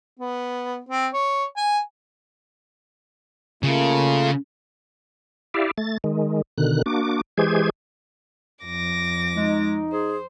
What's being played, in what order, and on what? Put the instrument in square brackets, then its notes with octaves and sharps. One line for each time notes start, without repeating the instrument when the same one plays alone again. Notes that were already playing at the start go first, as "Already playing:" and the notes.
[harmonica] B3
C4
C#5
G#5
[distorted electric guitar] C#3 [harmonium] A3 A#3 F4
[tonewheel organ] E4 G4 D5 E5 F5
A3 A6
D#3 G#3
B2 D3 D#3 F#6
A#3 D4 F#4 D6
E3 G#3 G4 G#4 C5 G#6
[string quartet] F2 D6 A#6
[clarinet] G#3 [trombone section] D#4
[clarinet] G#4 [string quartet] C5